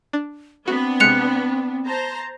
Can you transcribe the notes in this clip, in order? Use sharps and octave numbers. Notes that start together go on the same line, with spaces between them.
D4
B3 C4 D4 F#4
C3 G#3 F#6 C#7 F7
C5 A5 A#5